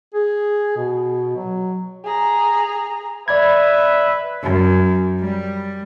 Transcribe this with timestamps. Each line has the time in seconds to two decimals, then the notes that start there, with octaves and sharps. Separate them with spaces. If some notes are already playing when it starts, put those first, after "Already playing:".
0.14 G#4
0.77 B2
1.36 F#3
2.05 G#4 A#5
3.28 B4 D5 E5 B5 G#6
4.43 F#2
5.19 G3